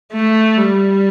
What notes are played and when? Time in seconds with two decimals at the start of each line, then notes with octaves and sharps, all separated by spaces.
0.13 A3
0.56 G3